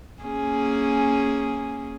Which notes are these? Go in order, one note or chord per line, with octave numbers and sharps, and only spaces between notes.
A#3 C#4 G#4